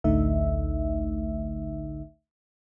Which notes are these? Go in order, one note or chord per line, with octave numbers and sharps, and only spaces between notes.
A1 D2 D3 A3 D#4 E5